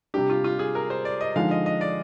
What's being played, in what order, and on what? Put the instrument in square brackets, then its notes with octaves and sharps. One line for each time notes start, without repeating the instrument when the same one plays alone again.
[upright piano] C3 G3 D4 [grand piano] G4
[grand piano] F4
F4
G#4
A#4
C5
D5
D#5
[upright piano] D3 F3 G#3 D#4 [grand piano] F5
[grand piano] D#5
D#5
D5